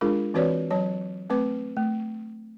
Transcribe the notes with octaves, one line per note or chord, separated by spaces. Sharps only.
G#3 D4 F4 G#4 A#4
E3 C4 F#4 B4 C#5 D5
F#3 C#5 A5
A3 C4 B4 D6
A3